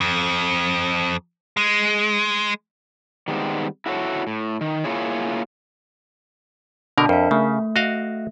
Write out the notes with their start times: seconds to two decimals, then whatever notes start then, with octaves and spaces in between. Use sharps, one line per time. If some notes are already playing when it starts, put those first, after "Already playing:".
0.01 F2
1.57 G#3
3.28 D#3 G3 G#3 B3 C4
3.86 E4 F#4 A4 C5 C#5
4.27 A2
4.61 D#3
4.84 A#3 E4 F4 G#4 C#5
6.98 B2 D3 D4 A#4
7.09 F2 A#4 E5
7.31 C#3 A3
7.76 F#4 D#5 F5